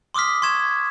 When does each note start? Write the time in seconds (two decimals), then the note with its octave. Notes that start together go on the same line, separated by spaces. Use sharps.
0.14 C6 D6 D#6 F6 B6
0.42 C6 C#6 G#6 E7